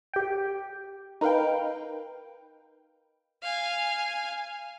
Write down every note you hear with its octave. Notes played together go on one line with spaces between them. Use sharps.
G4 G5
D#4 A#4 B4 F5 G5
F5 G#5